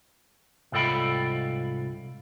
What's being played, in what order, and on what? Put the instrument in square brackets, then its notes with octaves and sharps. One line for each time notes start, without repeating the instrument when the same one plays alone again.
[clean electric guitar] C2 G#2 F4 A4 G5 B5